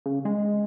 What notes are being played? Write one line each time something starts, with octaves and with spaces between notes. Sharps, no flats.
C#3
G#3